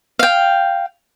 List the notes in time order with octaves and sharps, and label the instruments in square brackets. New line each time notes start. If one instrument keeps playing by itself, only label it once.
[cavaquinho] F5 G5